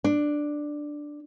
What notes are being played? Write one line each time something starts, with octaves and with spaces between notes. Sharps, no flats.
D4